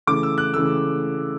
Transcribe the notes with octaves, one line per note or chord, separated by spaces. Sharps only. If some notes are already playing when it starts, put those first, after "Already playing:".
C#3 E3 A3 D6
E6
F#6
C#3 E3 A3 E6